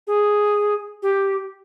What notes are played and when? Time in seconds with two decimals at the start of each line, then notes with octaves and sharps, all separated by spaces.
0.07 G#4
1.02 G4